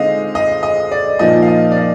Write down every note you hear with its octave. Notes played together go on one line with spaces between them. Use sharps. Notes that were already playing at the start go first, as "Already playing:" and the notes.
Already playing: D3 G#3 C4 D#4 D#5 F5
D#5
D#5
D5
A#2 F3 A#3 D#4 D#5
F5
D#5
D5
D#5